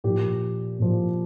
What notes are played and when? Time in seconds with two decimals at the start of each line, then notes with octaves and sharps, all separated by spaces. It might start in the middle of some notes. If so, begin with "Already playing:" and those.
0.04 A#2 F3 G4
0.79 A#2 F3